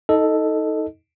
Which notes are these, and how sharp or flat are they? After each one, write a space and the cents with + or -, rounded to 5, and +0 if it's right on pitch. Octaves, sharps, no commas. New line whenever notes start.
D#4 +30 A4 +0 D#5 +0